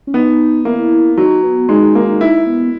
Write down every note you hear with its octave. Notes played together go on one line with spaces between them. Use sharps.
C#4
B3 D#4
A#3 E4
F#3 D#4
B3
G#3 D#4
A#3
D#4 E4
B3